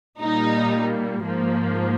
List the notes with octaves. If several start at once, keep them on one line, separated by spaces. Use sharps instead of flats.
A#2 G3 A#3 D#4
G#2 F3 A#3